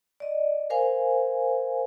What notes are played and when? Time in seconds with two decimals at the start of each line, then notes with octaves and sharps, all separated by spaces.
0.20 D5 D#5
0.70 A#4 C5 F5 G#5